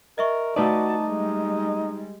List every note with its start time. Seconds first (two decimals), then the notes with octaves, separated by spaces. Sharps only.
0.18 A#4 D#5 E5 C#6
0.56 A3 D#4 F#4 B4 D5 A5
1.05 G3 G#3